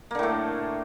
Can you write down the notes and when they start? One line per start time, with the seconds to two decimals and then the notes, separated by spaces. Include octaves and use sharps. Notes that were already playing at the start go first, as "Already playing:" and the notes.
0.11 A#3
0.15 D3
0.19 A2
0.23 A3